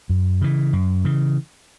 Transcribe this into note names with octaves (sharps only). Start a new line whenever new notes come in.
F#2
C#3 E3
F#2
C#3 E3